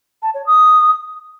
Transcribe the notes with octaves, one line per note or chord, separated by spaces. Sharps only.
A5
C#5
D#6